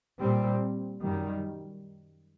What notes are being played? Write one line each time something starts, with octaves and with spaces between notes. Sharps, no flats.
A#2 G3 C4
F#2 D#3 G3